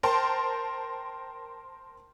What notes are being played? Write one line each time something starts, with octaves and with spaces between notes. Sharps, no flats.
A#4 C5 G5 A5 C6